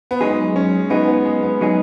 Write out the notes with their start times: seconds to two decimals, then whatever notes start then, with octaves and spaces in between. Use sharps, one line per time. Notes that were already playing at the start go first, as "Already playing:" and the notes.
0.11 B3
0.21 F#2 F#3 G#3 D#4 G#4
0.56 C#4
0.90 F#2 F#3 B3 D#4 G#4
1.07 B3
1.25 G#3
1.42 B3
1.61 F#3 D#4 G#4